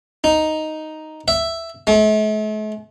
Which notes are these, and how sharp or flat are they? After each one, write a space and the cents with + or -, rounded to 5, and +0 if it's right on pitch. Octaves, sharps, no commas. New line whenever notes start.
D#4 +0
E5 +5
A3 -45